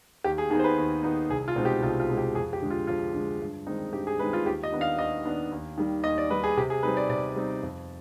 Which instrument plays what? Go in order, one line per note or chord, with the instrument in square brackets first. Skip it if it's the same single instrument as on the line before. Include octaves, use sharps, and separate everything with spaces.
[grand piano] D#2 G4
G#4
D#3 B3 D#4 G#4
C5
B4
D#2
D#3 B3 D#4
C2 G#4
F4
B2 G#3 C4 D#4
G4
C2 F4
F4
B2 G#3 C4 D#4
G4
F2 G#4
G4
D3 G#3
F4
F2 F4
D3 G#3
G2
D#3 G#3 C4 D#4
G2 G4
G#4
D#3 G#3 C4 D#4 B4
F4
D#2 G4
D#5
D#3 B3 D4
F5
D#2 D#5
D#3 B3 D4
D#2
D#3 G3
D#2 D#5
D5
D#3 G3 B4
G#4
C3 G4
G#4
G3 C4 D#4 B4
D5
C3 D5
G3 C4 D#4
F2